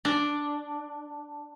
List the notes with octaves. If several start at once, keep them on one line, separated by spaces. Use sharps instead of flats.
D4